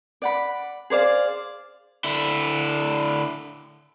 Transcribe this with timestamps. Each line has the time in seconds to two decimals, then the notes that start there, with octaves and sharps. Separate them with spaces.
0.22 D5 F#5 B5
0.90 G#4 C5 D5 F5
2.04 D3 E4